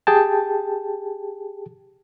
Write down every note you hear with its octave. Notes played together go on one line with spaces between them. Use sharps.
G4 G#4 G5 A5